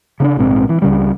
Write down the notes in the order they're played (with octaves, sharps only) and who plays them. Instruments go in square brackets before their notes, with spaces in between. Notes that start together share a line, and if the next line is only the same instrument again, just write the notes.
[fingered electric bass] C#3 C#4 D4
A#1 G#2 C4
E3
C#2 C#3 G3